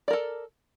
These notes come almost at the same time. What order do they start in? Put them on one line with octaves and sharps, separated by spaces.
D5 A#4 A4